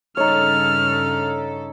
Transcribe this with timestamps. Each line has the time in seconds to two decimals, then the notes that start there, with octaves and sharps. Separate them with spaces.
0.17 G2 C#3 D#4 A4 C#5 F6